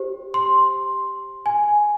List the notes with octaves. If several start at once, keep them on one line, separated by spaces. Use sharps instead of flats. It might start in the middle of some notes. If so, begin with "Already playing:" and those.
Already playing: G4 C5
C6
G#5